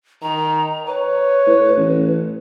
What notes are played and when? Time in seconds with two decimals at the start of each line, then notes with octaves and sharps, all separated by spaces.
0.22 D#3 A#5
0.86 B4 C#5
1.47 A2
1.77 A1